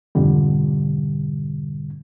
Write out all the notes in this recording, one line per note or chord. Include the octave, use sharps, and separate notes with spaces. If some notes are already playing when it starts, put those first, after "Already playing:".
F2 G#2 B2 D3 G3